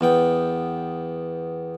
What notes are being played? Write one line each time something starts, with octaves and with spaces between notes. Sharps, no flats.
E2 B3 G5